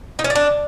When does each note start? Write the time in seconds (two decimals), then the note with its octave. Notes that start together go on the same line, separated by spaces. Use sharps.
0.19 D#4
0.24 C#4
0.30 D5
0.35 D4